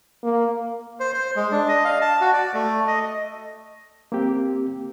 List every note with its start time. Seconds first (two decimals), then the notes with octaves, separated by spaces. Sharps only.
0.23 A#3
1.00 C5
1.14 C5
1.36 G#3
1.51 D4
1.69 D#5
1.85 F5
2.01 A5
2.21 F#4
2.33 D5
2.54 A3
2.87 D#5
4.12 A#3 C4 G4